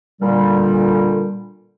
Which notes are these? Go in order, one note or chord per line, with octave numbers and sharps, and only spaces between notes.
A#2 D3 G3